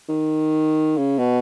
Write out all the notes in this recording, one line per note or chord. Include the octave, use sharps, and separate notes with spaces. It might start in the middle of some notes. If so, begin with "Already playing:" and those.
D#3
C#3
B2